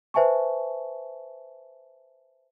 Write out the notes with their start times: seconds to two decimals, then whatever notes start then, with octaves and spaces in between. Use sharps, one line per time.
0.14 B4 C5 E5 G#5 A5 C#6